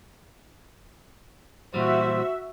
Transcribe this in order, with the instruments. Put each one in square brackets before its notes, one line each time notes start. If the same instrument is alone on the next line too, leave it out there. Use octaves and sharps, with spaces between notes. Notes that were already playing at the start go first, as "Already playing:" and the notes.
[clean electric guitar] A#2 E3 G3 [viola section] F#4 E5 [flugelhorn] C5